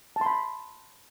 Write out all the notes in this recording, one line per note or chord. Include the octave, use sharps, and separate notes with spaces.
A5
C6
B5